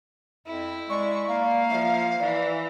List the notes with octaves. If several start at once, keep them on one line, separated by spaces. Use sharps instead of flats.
F2 E4
G#3 D5 C#6
A#3 F5
F3 E5
E3 D5